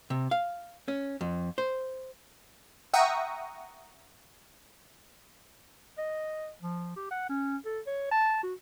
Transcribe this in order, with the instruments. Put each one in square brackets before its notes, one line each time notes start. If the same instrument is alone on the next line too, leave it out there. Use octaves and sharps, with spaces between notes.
[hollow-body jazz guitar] C3
F5
C#4
F2
C5
[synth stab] E5 F#5 G5 A#5 C#6 D#6
[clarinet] D#5
F3
G4
F#5
C#4
A4
C#5
A5
F#4